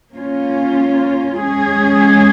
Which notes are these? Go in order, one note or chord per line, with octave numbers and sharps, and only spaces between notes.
A#3 C#4 F4
G#3 C#4 G#4